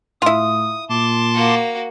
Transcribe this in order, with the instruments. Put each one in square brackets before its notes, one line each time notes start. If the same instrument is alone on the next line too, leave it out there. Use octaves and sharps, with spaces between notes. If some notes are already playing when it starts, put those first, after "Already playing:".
[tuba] A2 [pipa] E4 F4 [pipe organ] D#6
[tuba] A#2 [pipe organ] A5 C6 D6
[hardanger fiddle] A#3 F#4